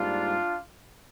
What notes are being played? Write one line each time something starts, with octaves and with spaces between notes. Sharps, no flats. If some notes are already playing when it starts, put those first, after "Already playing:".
Already playing: G#2 G3 A#3 D4 F4